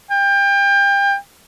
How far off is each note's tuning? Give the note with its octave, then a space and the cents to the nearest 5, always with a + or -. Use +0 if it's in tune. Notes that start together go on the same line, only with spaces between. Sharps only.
G5 +30